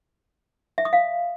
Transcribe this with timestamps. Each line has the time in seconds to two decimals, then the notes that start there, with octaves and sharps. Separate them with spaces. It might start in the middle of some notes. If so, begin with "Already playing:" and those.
0.78 E5
0.85 D#6
0.93 F5